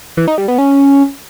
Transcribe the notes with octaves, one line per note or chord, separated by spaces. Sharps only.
E3
D#4
G3
B3
C#4